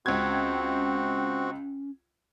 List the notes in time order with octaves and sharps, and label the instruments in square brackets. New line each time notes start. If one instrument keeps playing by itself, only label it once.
[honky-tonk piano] C#2 G#6 [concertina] C4 F#4 [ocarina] C#4